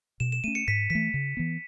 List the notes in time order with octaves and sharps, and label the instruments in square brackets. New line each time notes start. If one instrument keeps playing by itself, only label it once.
[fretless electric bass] B2 [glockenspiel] E7
[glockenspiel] E7
[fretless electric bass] A3 C#4 [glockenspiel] D#7
[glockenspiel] C#7
[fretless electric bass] G#2 [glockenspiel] B6
[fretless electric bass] E3 A3 [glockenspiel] B6
[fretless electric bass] C#3
E3 B3